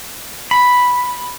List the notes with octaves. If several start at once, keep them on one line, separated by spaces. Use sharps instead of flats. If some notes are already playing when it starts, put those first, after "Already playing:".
B5